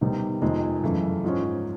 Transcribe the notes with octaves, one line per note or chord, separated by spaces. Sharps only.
C3 D#3 G3 B3
F2 C3 D#3 G#3
F#2 C#3 E3 A3
G#2 F3 G#3 C#4